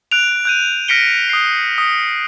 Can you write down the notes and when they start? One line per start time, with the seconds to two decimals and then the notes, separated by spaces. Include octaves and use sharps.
0.12 F#6 D7 F7
0.45 F#6 G6 D#7
0.88 F6 A#6 B6 C#7 D7 G7
1.29 D#6 C7
1.78 D#6